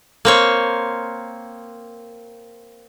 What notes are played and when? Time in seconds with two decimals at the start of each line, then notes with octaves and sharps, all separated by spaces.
0.25 A#3 C4 C#5